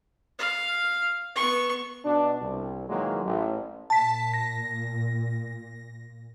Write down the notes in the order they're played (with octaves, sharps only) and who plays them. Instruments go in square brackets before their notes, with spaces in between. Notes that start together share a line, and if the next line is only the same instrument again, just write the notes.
[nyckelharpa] F5
B3 C#6
[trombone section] B2 D4
C2
A#2 D#3 E3 F#3 G#3 A#3
A1
[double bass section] A#2 [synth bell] A5 B6
[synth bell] A#6